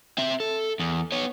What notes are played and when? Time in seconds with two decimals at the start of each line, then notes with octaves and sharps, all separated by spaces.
0.18 C4 E5
0.40 A4
0.80 E2
1.12 B3 C#5